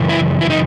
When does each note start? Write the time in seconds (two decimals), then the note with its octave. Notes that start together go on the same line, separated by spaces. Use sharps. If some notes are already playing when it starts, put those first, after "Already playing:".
Already playing: F#2 C#3 E3
0.09 E4
0.41 E4
0.50 D#4